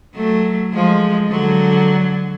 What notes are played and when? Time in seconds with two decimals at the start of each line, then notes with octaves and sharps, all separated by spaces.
0.15 F#3 A3
0.73 F3 G#3
1.31 D3 F#3